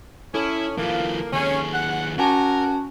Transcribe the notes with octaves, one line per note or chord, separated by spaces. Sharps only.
C#4 E4 A4
E3 A#3 F4
D#2 C#4 G#4
F#5
C#4 F#4 A#4 G#5 A5